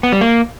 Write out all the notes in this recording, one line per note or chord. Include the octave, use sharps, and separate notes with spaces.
B3
G3
A#3